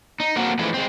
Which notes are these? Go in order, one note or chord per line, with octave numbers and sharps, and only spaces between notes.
D#4
A#3 C4 F#4 A4 A#4
E3 F3 G#3 A3
G#3 C4